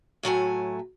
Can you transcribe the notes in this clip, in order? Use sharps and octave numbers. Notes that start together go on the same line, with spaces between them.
A2 F#3 A3 G#5